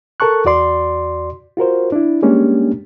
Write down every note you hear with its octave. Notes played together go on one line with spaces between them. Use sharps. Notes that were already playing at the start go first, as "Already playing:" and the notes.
A4 A#4 A5 C#6 F#6
E2 F#4 D5 C6
F4 F#4 A#4 C5
D4 E4
G3 G#3 A#3 C#4 D4 G4